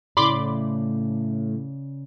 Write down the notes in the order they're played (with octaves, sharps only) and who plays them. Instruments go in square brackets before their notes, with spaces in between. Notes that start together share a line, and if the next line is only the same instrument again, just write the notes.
[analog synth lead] A2 [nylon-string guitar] C#3 D5 [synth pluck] B5 C6 D6